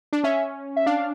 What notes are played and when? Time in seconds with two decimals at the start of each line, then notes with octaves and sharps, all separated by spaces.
0.13 D4
0.24 C#4 E5
0.77 E5
0.86 D4 F5